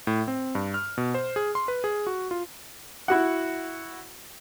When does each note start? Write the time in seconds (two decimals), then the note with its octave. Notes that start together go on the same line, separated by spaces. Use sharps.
0.07 A2
0.28 C4
0.55 G2
0.74 F6
0.98 B2
1.14 C5
1.36 G#4
1.55 C6
1.68 B4
1.84 G#4
2.07 F#4
2.31 F4
3.08 E4 F#4 F#5